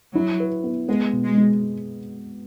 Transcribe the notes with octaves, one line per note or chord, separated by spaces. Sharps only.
F#3 E4
B4
B3
G#3 B3
B2
G#3
G#3